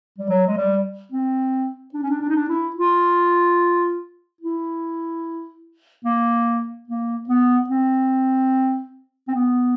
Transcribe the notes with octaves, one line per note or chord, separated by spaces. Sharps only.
G3
F#3
G#3
G3
C4
D4
C#4
D4
D4
D#4
D4
E4
F4
E4
A#3
A#3
B3
C4
C4
B3